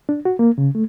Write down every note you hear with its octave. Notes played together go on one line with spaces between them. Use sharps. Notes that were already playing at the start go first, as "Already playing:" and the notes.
D4
F#4
A#3
C#3
A3